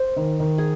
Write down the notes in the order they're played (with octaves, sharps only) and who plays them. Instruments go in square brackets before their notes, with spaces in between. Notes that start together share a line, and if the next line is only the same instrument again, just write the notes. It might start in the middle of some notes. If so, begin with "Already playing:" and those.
Already playing: [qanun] A#4 C5
[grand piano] D#3
D#3
[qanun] G#4